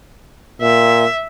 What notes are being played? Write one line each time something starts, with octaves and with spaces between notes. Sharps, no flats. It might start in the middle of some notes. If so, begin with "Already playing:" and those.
A#2 E5